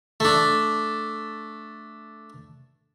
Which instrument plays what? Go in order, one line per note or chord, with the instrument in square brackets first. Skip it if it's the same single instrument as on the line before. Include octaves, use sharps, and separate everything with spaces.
[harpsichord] A3 D4